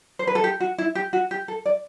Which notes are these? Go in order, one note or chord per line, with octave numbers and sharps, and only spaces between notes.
C5
B4
A4
G4
F#4
E4
G4
F#4
G4
A4
D5